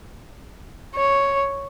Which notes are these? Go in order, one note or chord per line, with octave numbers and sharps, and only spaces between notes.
C#5